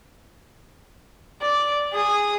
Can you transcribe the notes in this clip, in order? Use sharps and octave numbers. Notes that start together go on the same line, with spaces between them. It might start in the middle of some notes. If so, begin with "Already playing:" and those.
D5
G#4 D#6